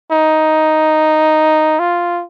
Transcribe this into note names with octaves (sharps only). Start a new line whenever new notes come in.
D#4
F4